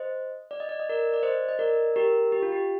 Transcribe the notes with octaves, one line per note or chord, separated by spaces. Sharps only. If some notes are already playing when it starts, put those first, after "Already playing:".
Already playing: C5 D#5
D5
D#5
D5
D#5
A#4 D5
D5
C5 D#5
D#5
A#4 D5
G4 A#4
G4
F4
G4